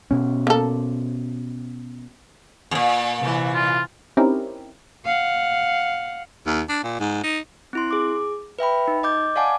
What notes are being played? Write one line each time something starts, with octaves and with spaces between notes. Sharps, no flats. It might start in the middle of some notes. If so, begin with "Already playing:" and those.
B2 C#4
A#3 A4
E2 A#2
C3 E3
F4
C4 C#4 D#4 E4 G4 A#4
F5 F#5
D#2
D4
A#2
G#2
D#4
C4 E4 C6
G#4 D6
B4 E5 G5 B5
D#4
D#5 D6 G6
D5 F5 F#5 G#5 A5 D6